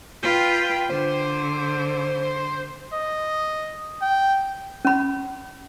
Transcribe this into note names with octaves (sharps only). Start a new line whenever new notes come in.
F4 B4 G5
D3 C5
D#5
G5
C#4 B5